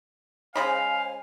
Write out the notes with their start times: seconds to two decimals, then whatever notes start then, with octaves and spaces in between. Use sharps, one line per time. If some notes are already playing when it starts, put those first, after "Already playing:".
0.56 C#3 G#3 C5 F5 G#5 B5